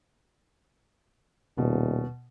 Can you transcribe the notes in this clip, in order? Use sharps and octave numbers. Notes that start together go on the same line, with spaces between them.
D#1 B2